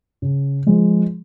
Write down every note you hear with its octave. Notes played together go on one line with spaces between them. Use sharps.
C#3
F3 G#3